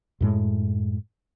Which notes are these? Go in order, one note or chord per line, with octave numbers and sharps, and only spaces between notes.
F#2 A2 G#3